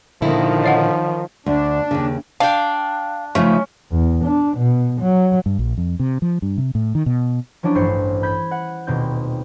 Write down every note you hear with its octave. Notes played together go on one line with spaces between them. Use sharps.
A#2 D3 D#3 F3 E4
C#5 D#5 F#5
D2 D4
D#2 C#3
D4 F5 G5
C#3 F3 A3 C#4 D#4
E2
D4
B2
F#3
G2
A#1
F2
C3
F3
G2
C3
A2
D#3
B2
F3 F#3 C#4 D4 E4
A1 G2 C5 C7 C#7
B5 G6 G#6 B6
F#5
D#1 B2 C4 G6